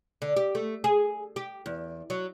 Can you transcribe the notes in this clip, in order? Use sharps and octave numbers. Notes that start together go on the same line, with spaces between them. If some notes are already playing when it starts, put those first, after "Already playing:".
D3
G4
A3
G#4
G4
E2
F#3